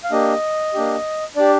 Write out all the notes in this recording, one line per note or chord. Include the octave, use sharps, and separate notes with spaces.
F5
A#3 D4 G4 D#5
A#3 D4 G4
D4 G4 D5